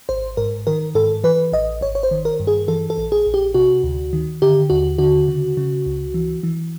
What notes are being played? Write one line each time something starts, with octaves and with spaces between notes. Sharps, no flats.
G#1 C5
G#2 A#4
D#3 A#4
G#2 A4
E3 B4
A1 D#5
G#1 C#5
C#5
C5
D#3
A#4
G2
G#4
E3 A4
A4
A#1
G#4
A#1
G4
C3 F#4
D2
D#3
D3 G4
D#2 F#4
D3 F#4
C#3
C#3
C#2
E3
E3